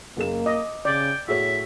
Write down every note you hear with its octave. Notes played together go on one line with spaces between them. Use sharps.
F#1 A#3 G#4 E7
D#5 D6
C#3 D5 G5
A2 F#4 G#4 C#5 E5